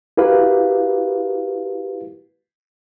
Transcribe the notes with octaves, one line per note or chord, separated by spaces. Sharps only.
E4 F#4 G4 A#4 B4 F5